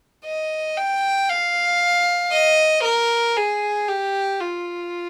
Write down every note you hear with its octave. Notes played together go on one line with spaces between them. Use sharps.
D#5
G5
F5
D#5
A#4
G#4
G4
F4